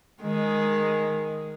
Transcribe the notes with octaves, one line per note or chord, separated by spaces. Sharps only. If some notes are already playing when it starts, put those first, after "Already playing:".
D#3 G#3